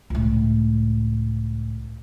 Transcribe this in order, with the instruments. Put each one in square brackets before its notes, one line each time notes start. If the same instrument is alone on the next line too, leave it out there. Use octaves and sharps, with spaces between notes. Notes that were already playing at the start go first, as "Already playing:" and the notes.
[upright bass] C#2 A2